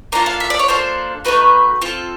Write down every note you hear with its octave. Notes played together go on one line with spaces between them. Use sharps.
A#3 D4 F4 A4 A#5
F5
E5
D5
C#5
A#3 D4 F4 A4 C5
A3 C4 D#4 F#4 B4
C4 F4 A4